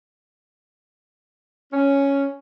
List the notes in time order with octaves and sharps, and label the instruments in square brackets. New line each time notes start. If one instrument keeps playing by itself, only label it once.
[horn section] C#4